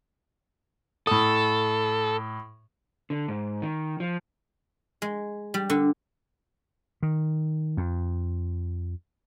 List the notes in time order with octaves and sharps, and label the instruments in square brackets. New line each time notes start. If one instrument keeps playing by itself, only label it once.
[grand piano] A2 D#6 [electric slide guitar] A4
[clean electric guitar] D3
G#2
D#3
F3
[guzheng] G#3
G3
D3
[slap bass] D#3
F2